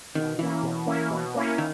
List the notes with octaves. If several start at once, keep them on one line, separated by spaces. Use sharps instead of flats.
B2 D#3
E3 A#3 C#4 E4
B2
A#3 C#4 E4
B2
A#3 C#4 E4
D#3